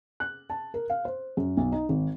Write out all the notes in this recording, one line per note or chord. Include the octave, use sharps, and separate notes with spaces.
F#6
A5
A#4
F5
C5
F#2
B1
D#4
G#1